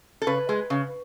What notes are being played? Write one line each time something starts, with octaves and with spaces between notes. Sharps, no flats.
A4
C#3 B4
G#3
C#3